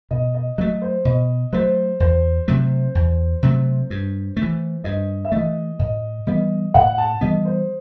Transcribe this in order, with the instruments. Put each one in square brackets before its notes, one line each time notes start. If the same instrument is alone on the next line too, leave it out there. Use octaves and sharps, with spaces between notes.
[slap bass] B2 [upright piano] D#5
[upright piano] D#5
[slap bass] F#3 A3 [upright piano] D#5
[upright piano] C5
[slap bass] B2 [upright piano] D#5
[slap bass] F#3 A3 [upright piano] C5
[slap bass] E2 [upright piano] C5
[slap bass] C3 F#3 A3
E2
C3 F#3 A3
G2
A3
E3
[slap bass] G2 [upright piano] D#5
[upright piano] E5
[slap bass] E3 A3 [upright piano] D#5
[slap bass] A2 [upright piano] D#5
[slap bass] E3 G3 B3 [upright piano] D#5
[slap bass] A2 [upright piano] F#5
[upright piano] A5
[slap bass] E3 G3 B3 [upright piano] D#5
[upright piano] C5